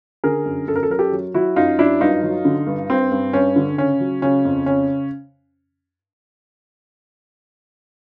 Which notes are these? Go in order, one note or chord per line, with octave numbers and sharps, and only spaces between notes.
D3 G#4 A#4
F#2
F#2 A4
A#4
A4
F#3 A#4
G4 A4
F#3
F#3 E4 F#4
F#2 D#4 F4
F#3 D4 E4
G2 D#4 F4
F#3
D3
G2
G2 C4
G2
G2 C#4
D3
C#3 C#4
F#3
C#3 C#4
F2
C#3 C#4